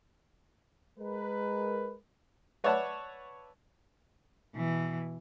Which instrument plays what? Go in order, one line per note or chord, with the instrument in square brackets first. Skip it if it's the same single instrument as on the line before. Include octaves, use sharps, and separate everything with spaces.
[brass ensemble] G#3 A#4 B4
[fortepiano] B4 C#5 D5 E5 F#5 A5
[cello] B2 E3